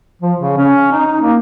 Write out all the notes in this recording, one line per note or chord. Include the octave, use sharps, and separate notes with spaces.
F3
C#3
C#4
D#4
A#3